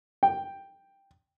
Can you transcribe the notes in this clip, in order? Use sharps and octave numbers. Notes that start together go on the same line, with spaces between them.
G5